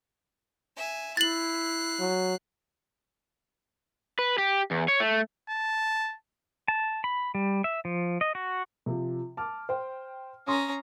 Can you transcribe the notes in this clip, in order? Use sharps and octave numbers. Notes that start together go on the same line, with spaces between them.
E5 G#5
E4 F#6 A6 C7 F#7
F#3
B4
G4
E2
C#5
A3
A5
A5
B5
G3
E5
F3
D#5
F#4
C3 F3
A5 D6 F6
C5 G5
C#4 A#5 C6 D#6